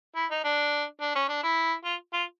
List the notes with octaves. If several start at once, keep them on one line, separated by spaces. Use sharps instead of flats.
E4
D#4
D4
D4
C#4
D4
E4
F4
F4